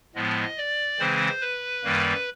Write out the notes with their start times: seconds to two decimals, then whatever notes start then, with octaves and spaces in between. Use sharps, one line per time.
0.15 A2 F3 G#3 B3 D#5
0.57 D5
0.99 C#3 E3 G#3 C4 C5
1.41 B4
1.84 F#2 D#3 G3 A#3